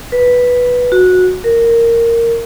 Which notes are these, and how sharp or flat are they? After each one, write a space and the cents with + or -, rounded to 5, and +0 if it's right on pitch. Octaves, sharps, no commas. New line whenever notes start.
B4 -5
F#4 -15
A#4 -10